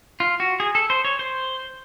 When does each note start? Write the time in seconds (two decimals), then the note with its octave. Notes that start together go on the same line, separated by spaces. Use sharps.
0.20 F4
0.40 F#4
0.60 G#4
0.75 A4
0.90 C5
1.05 C#5
1.19 C5